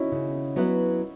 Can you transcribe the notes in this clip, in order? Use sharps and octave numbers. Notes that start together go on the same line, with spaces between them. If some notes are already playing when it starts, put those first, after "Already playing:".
Already playing: C#4 D#4 E4 F#4
C#3
F#3 B3 E4 B4